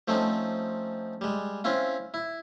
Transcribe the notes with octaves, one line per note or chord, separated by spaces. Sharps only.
F3 A3 C4 C#4 D#4
G3 G#3
C4 C#4 E4 F4
E4